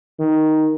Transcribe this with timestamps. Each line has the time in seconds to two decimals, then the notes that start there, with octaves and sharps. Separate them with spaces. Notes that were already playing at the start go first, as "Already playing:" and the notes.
0.19 D#3